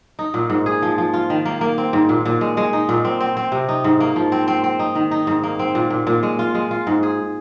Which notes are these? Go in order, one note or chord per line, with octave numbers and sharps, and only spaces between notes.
D#4
A#2
G#2
G#4
F3
F3
F4
D#3
A#3
A#3
C4
G#2
A#2
A#2
G#3
G#3
D#4
A#2
C4
C4
C4
C3
D#4
G#2
A#3
F3
C4
C4
C4
D#4
D#3
D#4
G#2
A#3
C4
A#2
A#2
A#2
G#3
F4
G#3
F4
G#2
G#4